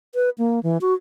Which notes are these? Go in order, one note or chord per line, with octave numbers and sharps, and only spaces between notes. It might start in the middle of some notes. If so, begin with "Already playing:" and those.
B4
A#3
E3
F#4